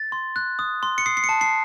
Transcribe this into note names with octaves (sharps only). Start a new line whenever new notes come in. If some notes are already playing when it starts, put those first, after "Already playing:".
Already playing: A6
C6
F#6
D#6
C6
C#7
D#6 C7
C7
C#7
A5
C7